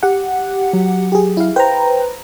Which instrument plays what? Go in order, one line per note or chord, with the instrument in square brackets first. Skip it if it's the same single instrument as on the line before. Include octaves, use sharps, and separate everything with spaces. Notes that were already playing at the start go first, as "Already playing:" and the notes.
[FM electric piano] G4 F#5
[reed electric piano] F#3
[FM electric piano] G4 G#4
E4 F5
[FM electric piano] B4 C5 A#5 [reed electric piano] G5